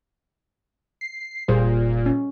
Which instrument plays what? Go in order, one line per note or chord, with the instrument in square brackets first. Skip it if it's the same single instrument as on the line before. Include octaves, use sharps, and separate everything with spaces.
[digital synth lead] C7
[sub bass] F1 [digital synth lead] A#2 [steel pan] G3 G#4 C5
[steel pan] C#4